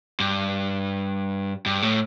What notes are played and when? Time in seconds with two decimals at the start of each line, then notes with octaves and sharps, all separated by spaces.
0.20 G2
1.66 G2
1.82 A2